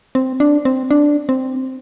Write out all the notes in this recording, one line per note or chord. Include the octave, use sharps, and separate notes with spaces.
C4
D4
C4
D4
C4